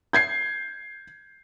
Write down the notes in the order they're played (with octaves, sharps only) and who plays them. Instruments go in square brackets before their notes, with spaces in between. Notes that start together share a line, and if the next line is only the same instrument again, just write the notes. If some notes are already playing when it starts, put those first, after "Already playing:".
[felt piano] G6 G#6 C7